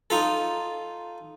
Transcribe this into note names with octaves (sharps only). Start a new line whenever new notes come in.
D#4 F4 A4